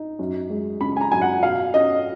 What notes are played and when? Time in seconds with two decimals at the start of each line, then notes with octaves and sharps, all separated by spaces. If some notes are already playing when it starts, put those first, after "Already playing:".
Already playing: D#4
0.19 F#2
0.50 G#3
0.81 C#3 B5
0.97 G#5
1.01 A#5
1.12 F#2 G#5
1.22 F#5
1.43 B2 F5
1.74 C#4 D#5